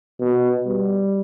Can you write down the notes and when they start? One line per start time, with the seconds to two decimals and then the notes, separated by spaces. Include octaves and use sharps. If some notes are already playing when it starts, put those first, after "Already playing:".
0.20 B2
0.67 G3